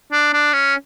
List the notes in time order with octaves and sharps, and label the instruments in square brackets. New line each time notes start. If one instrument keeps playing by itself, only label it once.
[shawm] D4
D4
C#4